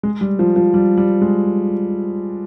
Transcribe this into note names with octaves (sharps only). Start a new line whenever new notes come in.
G#3
G3
F3
F3
G3
G3
G#3